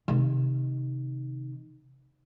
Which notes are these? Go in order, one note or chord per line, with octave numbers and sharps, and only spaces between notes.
C3 D#3